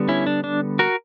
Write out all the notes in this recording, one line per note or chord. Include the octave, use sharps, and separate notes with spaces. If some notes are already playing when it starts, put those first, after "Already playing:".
Already playing: D3 G3 B3
C#4 E4
D4
D4
F#4 A#4